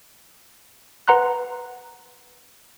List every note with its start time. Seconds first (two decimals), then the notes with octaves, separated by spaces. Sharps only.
1.08 B4 F#5 A#5 C6 F#6